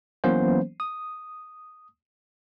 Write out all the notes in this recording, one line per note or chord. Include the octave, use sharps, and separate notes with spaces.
E3 F#3 A#3 B3 C#4 C5
D#6